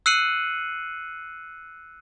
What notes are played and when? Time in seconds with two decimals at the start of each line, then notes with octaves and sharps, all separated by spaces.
0.06 E6 F#6 C7 C#7 D#7 F#7